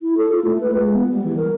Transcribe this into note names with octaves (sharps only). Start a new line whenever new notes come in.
E4
A4
F4
A3
B4
G#3
B3
G3
E3
A#4